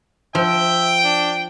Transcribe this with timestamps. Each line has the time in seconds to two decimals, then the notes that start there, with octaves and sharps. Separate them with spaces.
0.35 F3 E5 G5
1.04 D4